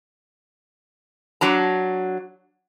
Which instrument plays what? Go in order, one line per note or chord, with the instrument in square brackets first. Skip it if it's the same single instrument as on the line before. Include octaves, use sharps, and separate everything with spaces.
[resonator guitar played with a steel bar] F#3 D4 A#5